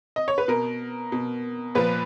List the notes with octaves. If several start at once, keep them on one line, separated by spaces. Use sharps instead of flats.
D#5
C#5
B4
B2 A#4
B2
A#2 F3 B4